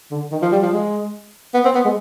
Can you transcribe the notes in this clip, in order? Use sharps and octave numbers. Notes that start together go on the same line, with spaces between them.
D3
D#3
F3
G3
F3
G#3
B3
C4
B3
G#3